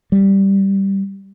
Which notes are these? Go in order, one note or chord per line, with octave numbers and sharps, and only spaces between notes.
G3